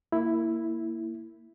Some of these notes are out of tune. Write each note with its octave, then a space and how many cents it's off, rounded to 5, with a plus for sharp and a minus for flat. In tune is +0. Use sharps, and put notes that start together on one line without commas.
A#3 -15 E4 +0